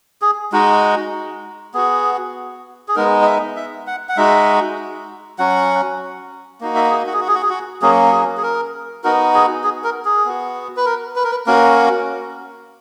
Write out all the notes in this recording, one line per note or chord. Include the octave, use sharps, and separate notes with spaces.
G#4
G#3 D#4 F#4
B3 F#4 G#4
G#4
G#3 B3 D#4 A#4
D#5
E5
E5
F#5
F#5
G#3 D#4 F#4 E5
F#3 C#4 F#4 F#5
A#3 D#4 F#4
E5
G#4
F#4
G#4
F#4
G#4
F#4
G#4
F#4
F#3 A#3 C#4 G#4
G#4
G#4
A#4
B3 D#4 F#4 A#4
G#4
G#4
A#4
G#4
B3 F#4
B4
A#4
B4
A#4
B4
A#3 C#4 F#4 A#4